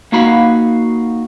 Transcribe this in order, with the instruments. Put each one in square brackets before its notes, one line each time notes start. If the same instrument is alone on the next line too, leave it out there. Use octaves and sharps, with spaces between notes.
[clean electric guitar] A#3 D#4 F#4 F5 B5